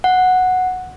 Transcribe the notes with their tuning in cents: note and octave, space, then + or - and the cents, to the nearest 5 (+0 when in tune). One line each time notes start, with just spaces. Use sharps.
F#5 -5